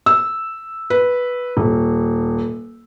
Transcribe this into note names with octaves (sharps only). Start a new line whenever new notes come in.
E6
B4
D#1